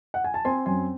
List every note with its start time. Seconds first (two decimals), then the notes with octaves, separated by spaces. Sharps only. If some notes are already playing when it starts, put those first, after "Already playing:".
0.14 F#5
0.24 G#5
0.34 A5
0.45 C4 G#5 C6
0.66 F#2 G#5 C6